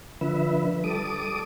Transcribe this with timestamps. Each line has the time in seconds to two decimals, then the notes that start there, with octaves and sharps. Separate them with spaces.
0.21 D3 F3 B4 E5
0.84 G3 A4 D6 D#6